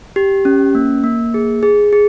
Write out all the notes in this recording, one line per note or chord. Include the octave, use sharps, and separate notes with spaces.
G4
C#4
A#3
A#3
G#4
G#4
G#4